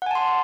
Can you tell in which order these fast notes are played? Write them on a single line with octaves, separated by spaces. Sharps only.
F#5 G#5 A5 C6